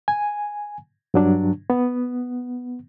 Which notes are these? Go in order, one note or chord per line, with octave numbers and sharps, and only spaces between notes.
G#5
G2 F#3 D4
B3